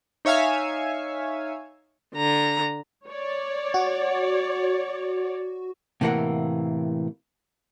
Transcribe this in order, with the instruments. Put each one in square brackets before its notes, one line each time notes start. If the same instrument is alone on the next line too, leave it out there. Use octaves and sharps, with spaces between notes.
[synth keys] D#4 C#5 E5 F5 G#5
[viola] D3 A#5
[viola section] C#5 D5
[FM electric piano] F#4
[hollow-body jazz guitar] A2 C3 E3 A#3 A#4 F#5